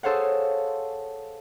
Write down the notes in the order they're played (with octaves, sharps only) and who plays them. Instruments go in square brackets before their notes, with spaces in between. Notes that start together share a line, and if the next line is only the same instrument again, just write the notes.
[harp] G#4 A4 C5 C#5 F5 F#5